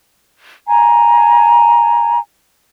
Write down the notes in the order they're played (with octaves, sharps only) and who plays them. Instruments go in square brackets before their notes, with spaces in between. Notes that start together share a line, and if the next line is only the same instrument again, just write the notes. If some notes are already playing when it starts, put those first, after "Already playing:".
[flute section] G#5 A#5